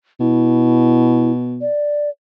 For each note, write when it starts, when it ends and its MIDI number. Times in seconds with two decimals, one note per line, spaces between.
0.20 1.67 47
0.20 1.31 64
1.61 2.10 74